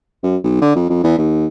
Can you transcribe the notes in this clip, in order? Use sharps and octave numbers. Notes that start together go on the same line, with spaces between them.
F#2
B1
D3
F2
F2
E2
D#2